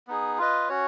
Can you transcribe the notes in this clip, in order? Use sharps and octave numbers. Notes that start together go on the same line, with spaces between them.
B3 D#4 G#4
F4 B4 D#5
C#4 F#4 C#5